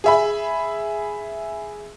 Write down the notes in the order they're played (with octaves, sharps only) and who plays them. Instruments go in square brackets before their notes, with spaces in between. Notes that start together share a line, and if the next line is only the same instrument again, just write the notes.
[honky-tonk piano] G#4 E5 B5